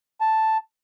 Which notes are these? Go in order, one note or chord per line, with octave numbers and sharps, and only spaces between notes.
A5